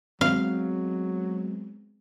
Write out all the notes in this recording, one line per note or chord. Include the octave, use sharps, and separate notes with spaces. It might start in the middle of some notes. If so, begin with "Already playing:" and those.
F#3 G#3 B3 C4 F5